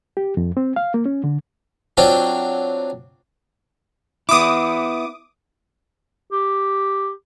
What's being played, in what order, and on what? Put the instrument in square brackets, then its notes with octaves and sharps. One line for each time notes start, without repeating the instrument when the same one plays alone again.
[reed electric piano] G4
F2
C4
F5
A#3
C#4
D3
[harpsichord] F#3 C4 D4 F4
[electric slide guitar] B3 E4 [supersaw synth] D6 D#6
[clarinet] G4